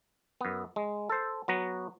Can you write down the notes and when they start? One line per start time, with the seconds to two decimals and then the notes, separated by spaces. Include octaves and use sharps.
0.41 F#2 B3
0.76 G#3
1.09 A4 C5
1.48 F#3 B3 F#4 A#5